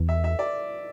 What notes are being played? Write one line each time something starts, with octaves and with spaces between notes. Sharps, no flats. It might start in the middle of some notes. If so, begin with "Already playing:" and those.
Already playing: E2
E5
E5
D5